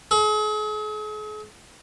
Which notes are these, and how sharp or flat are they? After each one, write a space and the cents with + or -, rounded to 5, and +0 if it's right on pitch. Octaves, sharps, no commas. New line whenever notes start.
G#4 +45